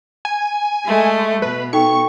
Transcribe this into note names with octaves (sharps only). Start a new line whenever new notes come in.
G#5
G#3 A3
B2 B4
D#4 A4 G5 C#6